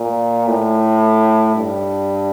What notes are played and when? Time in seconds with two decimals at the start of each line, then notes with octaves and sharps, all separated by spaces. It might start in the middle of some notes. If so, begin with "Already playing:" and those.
Already playing: A#2
0.47 A2
1.56 G2